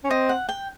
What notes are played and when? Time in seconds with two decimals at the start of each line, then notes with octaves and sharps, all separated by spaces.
0.04 C#4
0.10 C4 D#5
0.29 F#5
0.49 G5